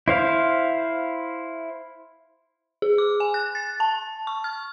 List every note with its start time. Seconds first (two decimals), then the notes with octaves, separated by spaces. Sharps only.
0.08 E4 C5 F5
2.82 G#4
2.98 D6
3.20 G#5
3.34 F#6
3.55 A6
3.80 A5
4.27 C#6
4.44 F6